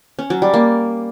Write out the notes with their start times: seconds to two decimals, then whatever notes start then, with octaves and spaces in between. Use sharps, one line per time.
0.19 C#4
0.30 F#3
0.42 G3
0.54 A#3